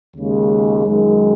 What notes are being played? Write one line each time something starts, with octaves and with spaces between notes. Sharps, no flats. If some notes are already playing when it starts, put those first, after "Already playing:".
D#2 C#3 G#3
F#2 D#3 G#3